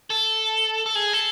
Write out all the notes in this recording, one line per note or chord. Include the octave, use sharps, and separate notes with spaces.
A4
A4
G#4
A4